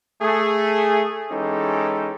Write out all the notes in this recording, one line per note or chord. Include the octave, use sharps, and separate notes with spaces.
A3 G#4
E3 G#3 C#4 D#4 G4 A4